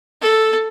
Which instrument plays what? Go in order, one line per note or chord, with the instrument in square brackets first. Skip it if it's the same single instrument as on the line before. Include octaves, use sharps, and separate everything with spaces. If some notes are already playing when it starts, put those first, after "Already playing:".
[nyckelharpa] A4